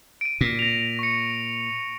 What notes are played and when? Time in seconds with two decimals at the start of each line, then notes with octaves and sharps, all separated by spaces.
0.21 D7 D#7
0.41 A#2
0.59 A#6 F7
0.99 C#6 C#7